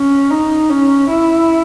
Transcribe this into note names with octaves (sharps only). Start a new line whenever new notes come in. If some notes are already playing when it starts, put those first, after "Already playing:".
Already playing: C#4
D#4
C#4
E4